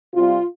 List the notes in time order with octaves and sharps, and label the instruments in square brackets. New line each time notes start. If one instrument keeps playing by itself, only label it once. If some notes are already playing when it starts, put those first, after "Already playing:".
[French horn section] C3 G3 C4 F4